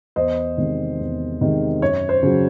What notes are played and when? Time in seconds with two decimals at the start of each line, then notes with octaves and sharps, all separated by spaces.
0.16 E2 C5 D#5
0.57 C3 D#3 G#3
0.99 E2
1.41 C3 D#3 G#3
1.82 F#2 C#5
2.09 C5
2.23 C#3 F#3